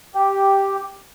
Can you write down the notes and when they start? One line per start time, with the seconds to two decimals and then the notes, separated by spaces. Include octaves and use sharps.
0.15 G4